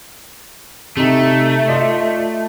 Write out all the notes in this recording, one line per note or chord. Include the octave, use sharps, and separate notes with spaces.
C3 A3 D#4
F4 D5 D#5